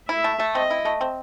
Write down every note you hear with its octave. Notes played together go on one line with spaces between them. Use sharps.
E4 E5
A3
A3
C4 D#5
E4
A3
C4